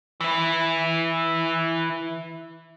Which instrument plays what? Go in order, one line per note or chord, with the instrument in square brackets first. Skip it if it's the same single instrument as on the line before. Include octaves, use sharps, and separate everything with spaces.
[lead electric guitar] E3 E4